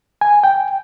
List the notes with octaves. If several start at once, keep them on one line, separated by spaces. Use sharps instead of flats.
G#5
G5